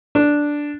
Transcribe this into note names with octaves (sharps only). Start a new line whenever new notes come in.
D4